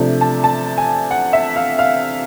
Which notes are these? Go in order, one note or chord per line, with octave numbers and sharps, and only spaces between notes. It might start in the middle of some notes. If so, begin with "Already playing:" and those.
Already playing: C3 F3 A3 D4
A5
A5
G#5
F#5
E5
F5
F5